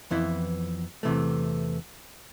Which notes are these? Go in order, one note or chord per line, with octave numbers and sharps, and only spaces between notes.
F2 E3 B3 E4
E2 C3 E3 A3